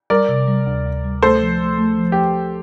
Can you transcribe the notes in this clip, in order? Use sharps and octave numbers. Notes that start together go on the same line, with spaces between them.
G3 A#4 D5
C3
G3
D2
D2
G3
A3 A4 C5
F3
A3
A3
F3
G4